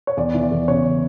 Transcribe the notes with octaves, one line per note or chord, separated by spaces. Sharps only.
C#5
E2 D5
E3
D5
E2
C#3 C#5